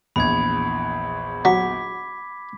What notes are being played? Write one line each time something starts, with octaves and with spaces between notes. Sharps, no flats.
A#1 E2 B5 G#6
F#3 D6 B6